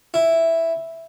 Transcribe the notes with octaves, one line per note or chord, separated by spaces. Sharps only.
E4